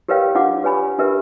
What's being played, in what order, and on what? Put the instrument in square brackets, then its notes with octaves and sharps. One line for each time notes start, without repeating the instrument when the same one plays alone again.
[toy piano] G4 A#4 B4 C#5 F5 G5
D4 F4 F5 F#5 D6
G4 B4 C#5 G#5 B5
D4 G4 A#4 B4 E5